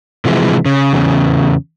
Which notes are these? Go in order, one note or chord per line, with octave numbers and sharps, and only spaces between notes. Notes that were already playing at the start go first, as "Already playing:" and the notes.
C3 E3 F3 G#3
C#3
E2 C#3